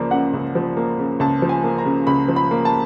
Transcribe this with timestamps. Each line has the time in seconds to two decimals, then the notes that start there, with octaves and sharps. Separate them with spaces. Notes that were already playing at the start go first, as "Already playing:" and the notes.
Already playing: C#2 F3 A#3 D5
0.11 C#3 F#5
0.34 C#2
0.55 F3
0.77 A#3
0.99 C#3
1.20 C#2 A5
1.42 F3
1.49 G#5
1.64 A#3
1.78 A#5
1.85 C#3
2.07 C#2 B5
2.28 F3
2.36 B5
2.51 A#3
2.65 A5